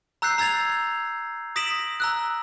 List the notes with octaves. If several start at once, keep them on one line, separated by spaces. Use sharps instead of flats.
A#5 E6 F#6 G6 C7
A#5 E6 G#6 A6 F7
D#6 A#6 B6 D7 E7 F#7
A#5 E6 F#6